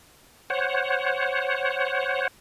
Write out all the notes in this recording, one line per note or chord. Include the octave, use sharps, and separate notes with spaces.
C5 C#5 F#5